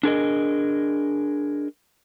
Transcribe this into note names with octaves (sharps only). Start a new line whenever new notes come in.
D4 G#4 A#4 D#5